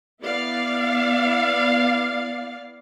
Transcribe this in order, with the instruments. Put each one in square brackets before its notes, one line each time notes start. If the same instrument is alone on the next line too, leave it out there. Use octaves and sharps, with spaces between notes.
[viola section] B3 E4 D5 F5